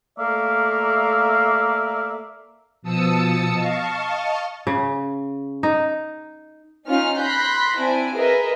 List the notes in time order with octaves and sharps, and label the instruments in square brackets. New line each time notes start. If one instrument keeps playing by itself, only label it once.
[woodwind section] A3 A#3 D5 E5 F5
[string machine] B2 F3 A5 D#6 E6 C#7
D#5 F5 A5 C#6
[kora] C#3
D#4
[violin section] C#4 D#4 F4 F6
B5 C6 F#6 G6 A#6 B6
C4 D4 E4 G#5 D7
G#4 A#4 B4 D#5 E5